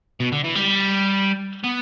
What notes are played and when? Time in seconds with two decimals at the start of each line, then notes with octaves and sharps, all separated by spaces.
0.20 B2
0.32 D3
0.44 E3
0.56 G3
1.64 B3